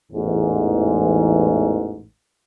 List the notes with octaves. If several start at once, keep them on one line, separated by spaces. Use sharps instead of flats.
A1 E2 G#2